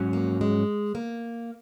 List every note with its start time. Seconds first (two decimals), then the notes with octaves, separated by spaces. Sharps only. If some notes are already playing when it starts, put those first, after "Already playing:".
Already playing: G#2 F#3 C#4 F#4
0.13 A#3
0.41 G#3
0.95 A#3